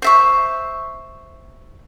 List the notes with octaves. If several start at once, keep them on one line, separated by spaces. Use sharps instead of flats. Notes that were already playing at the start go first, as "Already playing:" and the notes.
C5 E5 C#6